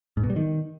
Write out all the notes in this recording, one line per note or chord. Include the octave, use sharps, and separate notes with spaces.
G#2
B2
G3
D#3